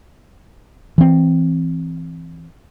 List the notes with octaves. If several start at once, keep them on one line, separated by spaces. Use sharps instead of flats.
E3 C4